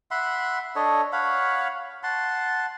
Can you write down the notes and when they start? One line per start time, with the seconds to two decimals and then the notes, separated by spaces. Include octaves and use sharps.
0.11 E5 F#5 B5 C6
0.76 D4 A4 C#5 D#5
1.13 C#5 F5 F#5 B5
2.03 F#5 A5 C6